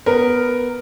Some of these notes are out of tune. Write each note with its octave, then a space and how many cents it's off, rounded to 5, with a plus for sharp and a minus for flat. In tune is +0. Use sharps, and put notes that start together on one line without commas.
B3 +0 A#4 +0